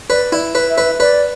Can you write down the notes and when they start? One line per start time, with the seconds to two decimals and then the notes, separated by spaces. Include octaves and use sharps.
0.10 B4 D5
0.32 E4
0.55 B4
0.70 E5
0.78 B4
1.00 B4 D5